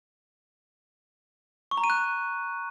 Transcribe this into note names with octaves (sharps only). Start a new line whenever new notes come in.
C#6
A#5
D#7
F#6